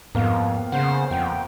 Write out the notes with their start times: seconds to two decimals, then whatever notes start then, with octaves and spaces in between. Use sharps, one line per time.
0.15 F2 G#2 A#3 B3 F5
0.72 C#3 C5 F#5
1.11 F2 G5